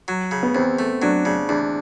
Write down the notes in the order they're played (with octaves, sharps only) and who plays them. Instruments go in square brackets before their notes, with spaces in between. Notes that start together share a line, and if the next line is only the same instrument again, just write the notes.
[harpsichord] F#3
C#3
[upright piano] B3
[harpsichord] E2 [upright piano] C4
[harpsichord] A3
[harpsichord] F#3 [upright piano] D4
[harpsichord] C#3 [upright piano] D4
[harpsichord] E2 [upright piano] D4